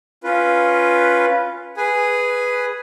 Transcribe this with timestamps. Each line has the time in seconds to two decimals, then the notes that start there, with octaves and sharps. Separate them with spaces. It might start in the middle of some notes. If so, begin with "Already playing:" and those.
0.24 C#4 F4 B4
1.77 G#4 B4 G#5